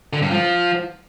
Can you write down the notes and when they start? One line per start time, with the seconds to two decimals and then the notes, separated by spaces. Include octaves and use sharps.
0.13 D3
0.22 G2
0.31 F3